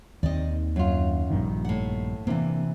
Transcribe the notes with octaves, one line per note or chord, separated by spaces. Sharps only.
D#2 D#3 C4 D5 D#5
F#2 F4
A#1 G2 D#3
A2 F#5
C3 E3 A#3 D4